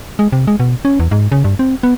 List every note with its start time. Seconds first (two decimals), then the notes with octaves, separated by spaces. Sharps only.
0.19 G#3
0.32 C3
0.47 G#3
0.60 B2
0.85 C#4
1.00 E2
1.11 G#2
1.32 C#3
1.44 G2
1.59 C4
1.83 B3